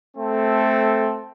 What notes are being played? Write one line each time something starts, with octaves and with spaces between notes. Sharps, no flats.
A3 C4 A4